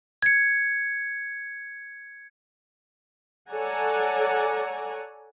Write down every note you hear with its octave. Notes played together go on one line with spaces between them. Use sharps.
G#6 C#7
A4 C#5 D5 F#5 G#5 A#5